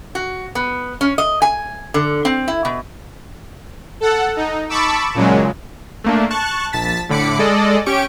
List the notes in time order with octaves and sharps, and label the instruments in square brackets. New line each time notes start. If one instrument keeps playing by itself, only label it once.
[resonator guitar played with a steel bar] F#4
B3
C#4
D#5
G#5
D3
C4
E4
B2
[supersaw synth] A4 F#5
D#4
A5 B5 C#6 D6 E6
A#2 C#3 F#3 G#3
[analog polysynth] A3 A#3 D4
A5 C#6 F#6
A#1 A5 A6 B6
A2 D3 B5 D6 C#7
G#3 A4 D5 D#5
C#4 G4 C#6 D7